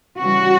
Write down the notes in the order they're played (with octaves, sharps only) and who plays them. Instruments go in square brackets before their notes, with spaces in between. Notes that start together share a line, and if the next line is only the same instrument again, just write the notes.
[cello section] C#3 E3 G3 F#4